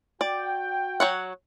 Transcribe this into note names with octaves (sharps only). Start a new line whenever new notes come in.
F#4 D5 G5
F#3 C#5 F#5